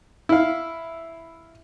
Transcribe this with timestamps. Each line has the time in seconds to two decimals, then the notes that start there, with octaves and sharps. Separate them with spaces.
0.29 E4 F5